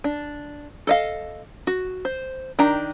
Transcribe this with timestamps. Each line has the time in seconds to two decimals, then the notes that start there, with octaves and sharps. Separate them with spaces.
0.04 D4
0.87 A4 D#5 F5
1.67 F#4
2.05 C5
2.59 D#3 D4 G4 A#5